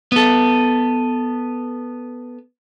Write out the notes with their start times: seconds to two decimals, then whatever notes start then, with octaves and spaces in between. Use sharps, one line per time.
0.12 B3 A4